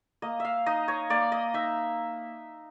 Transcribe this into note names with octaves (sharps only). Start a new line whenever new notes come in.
A#3 D#5
E5 F5
D#4 D#5
C#5
A#3 D5
D#5
D#4 E5